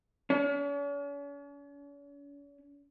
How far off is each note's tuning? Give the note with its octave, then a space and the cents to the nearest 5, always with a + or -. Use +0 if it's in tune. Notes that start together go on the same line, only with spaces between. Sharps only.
C#4 +45